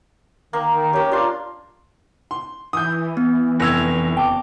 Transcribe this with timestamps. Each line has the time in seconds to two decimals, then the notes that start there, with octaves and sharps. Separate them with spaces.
0.53 D#3 A#3 A#4 F5
0.70 D#3
0.93 C#4 G4 A#4
1.12 D4 F4 C6
2.31 C6
2.73 E3 D#6 G6
3.17 B3
3.60 F1 E6 G#6 A#6 F7
4.17 F#1 G5 A5 D6